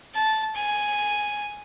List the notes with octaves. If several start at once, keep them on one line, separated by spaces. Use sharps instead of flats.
A5
G#5